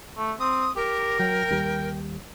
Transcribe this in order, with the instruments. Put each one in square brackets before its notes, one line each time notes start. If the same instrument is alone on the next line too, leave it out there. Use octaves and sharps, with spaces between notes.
[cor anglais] A3
[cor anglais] C4 [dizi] D#6
[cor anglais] G4 [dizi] A#4
[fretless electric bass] F#3 [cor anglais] G5
[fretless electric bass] D#2 G3